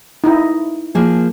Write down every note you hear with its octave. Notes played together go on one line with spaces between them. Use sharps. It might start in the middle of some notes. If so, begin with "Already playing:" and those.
D#4 E4
F3 A#3 G#4